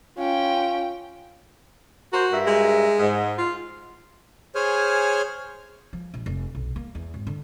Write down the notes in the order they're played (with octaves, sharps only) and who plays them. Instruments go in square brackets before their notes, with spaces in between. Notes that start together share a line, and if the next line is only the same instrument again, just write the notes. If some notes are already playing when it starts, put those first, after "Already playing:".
[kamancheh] C#4 G5 [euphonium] F4
[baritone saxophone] F#4 [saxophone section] A#4 C5
[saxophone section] G2 A#4 E5
[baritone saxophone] G#3
[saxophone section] G#2
[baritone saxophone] F4
[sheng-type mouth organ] G#4 C5 C#5 G#5 F6
[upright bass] F3
A#1
F1
B1
A#3
E2
G#1
D3